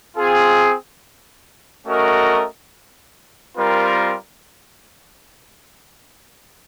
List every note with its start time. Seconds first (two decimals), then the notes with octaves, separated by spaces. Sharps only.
0.15 C4 F4 G#4
1.86 A3 C#4 F#4 A#4 D#5
3.57 G3 C4 F4 A#4